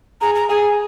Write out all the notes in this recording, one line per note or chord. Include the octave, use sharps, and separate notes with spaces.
G#4 A#5
A#5
G#4 G#5